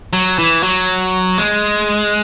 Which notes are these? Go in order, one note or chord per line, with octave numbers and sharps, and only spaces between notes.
F#3
E3
F#3
G#3